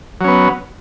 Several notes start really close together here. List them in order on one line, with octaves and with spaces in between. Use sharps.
F#3 C#4 B3